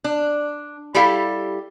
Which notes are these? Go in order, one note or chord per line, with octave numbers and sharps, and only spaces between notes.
D4
G3 E4 G4 A4 F5